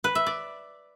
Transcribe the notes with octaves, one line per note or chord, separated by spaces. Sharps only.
B4
E5
D5